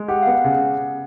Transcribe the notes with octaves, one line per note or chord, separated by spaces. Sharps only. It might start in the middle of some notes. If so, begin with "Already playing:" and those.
Already playing: G#3
G4 F#5
F5
B3 F#5
C#3